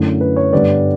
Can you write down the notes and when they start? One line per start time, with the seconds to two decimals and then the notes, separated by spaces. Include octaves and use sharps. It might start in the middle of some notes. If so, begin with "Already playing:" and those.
Already playing: F#2 D3 A3 C#4 E4
0.21 B4
0.36 C#5
0.53 G2 D3 G3 B3 B4 D5